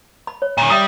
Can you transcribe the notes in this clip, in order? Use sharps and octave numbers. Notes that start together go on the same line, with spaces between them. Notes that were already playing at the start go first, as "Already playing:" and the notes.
B5
C#5
A#2 D#3
G3 E5 D#6